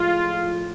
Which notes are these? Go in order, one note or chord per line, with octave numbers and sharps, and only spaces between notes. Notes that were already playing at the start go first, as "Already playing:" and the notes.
Already playing: A2 F3 G#3 F4